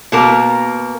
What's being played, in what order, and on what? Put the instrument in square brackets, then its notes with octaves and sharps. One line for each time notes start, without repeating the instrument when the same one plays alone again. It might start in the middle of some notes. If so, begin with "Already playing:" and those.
[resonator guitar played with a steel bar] B2 A#3 A#4